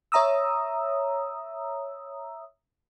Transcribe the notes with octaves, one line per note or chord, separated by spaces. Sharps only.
C#5 E5 A#5 D#6 E6